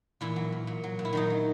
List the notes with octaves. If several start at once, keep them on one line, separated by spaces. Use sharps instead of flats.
A#2 E3 E4
F#3
A#2
A#2
F#3
A#2
E4
D#3 F#3 D#4
F#3